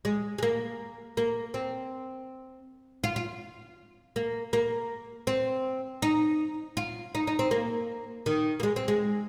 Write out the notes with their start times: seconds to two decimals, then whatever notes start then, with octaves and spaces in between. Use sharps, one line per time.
0.05 G#3
0.38 G#3
0.43 A#3
1.17 A#3
1.54 C4
3.04 F4
3.16 F4
4.16 A#3
4.53 A#3
5.27 C4
6.02 D#4
6.77 F4
7.15 D#4
7.27 D#4
7.39 C4
7.51 A#3
8.26 D#3
8.60 A#3
8.63 G#3
8.76 C4
8.88 G#3